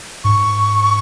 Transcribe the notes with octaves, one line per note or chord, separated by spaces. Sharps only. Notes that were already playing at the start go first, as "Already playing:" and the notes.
G#2 C#6